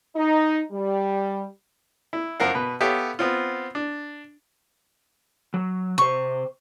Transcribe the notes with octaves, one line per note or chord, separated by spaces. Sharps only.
D#4
G3
E4
F#2 F3 A#4 F5 F#5
B2 B4
B3 G4 A4 C#5 E5 F5
B3 C4 F4
D4
F#3
C3 C5 C#6